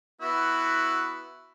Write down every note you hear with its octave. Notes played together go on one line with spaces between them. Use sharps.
B3 E4 F#4